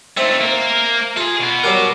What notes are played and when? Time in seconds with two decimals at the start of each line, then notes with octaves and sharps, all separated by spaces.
0.17 A3 C4 D#4 E5
0.41 A#3 A#4
1.17 F4 G#4 A4
1.41 B2 B3
1.64 F#3 G3 A#4